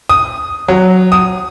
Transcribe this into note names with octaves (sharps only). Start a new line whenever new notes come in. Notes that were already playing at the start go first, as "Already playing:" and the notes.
D#6
F#3
D#6